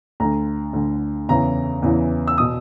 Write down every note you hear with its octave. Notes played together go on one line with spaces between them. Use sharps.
D2 D3 A#5
D2 D3
E2 C#3 E3 A#5
E2 C#3 E3
E6
B2 D#6